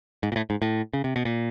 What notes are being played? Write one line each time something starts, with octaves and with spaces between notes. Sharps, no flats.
G#2
A#2
A2
G#2
A2
C#3
C3
B2
A#2